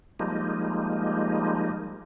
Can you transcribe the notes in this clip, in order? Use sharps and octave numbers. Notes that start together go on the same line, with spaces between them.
F3 G3 G#3 A#3 D#4